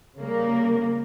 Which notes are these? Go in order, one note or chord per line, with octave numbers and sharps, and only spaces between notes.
C#3 G3 A#3